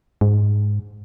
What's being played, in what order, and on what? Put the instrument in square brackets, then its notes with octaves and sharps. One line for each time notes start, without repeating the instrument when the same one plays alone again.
[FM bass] G#2